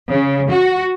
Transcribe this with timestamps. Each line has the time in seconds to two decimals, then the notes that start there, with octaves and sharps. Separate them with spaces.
0.11 C#3
0.51 F#4